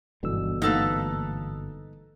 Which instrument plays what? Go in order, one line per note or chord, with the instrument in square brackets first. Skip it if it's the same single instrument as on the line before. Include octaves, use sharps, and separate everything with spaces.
[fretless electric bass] G1 B2 D3 [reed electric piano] G#2 E3 E6
[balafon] A3 A#3 F5 [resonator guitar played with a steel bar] D#4 A4 B4